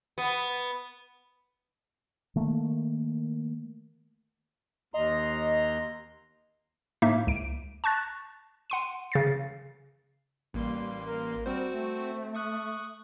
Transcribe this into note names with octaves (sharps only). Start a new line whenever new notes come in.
B3
D#3 A3 A#3
D#2 D#5 A#5 C6
A2 A#3 D#4 E5
C#2 D7
A5 C#6 F#6 A6
F#5 C6 D#7
C#3 A6 C7
A1 G3 A#3 C6
A#4
G3 C4 F#4 C5
A3
C#6 D#6 F#6